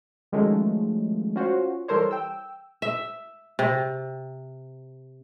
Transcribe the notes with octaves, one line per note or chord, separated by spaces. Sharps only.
D#3 F3 F#3 G#3 A3 C#4
C#4 F4 F#4 C5 C#5
E3 G3 A4 A#4 C5 C#5
G5 E6
E5
C3